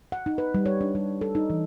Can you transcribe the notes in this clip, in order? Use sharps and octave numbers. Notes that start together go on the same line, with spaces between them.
F#5
D#4
B4
G3
C#5
D4
G3
A4
D#4
E3